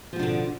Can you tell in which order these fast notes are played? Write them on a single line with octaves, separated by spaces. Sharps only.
F3 B2 D4 D3